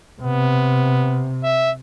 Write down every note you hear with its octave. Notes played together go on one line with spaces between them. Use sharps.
C3 B3
E5